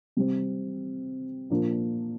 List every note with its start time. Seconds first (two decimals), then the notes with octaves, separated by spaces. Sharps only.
0.17 C3 G3 C4
1.50 A#2 F3 A#3 D4 A#4